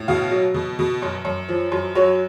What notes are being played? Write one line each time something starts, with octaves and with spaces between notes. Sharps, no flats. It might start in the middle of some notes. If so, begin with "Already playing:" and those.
Already playing: A2
B2 F5
F#3
B2
B2
F#2
F#2
F3
F#2
F#3 C#5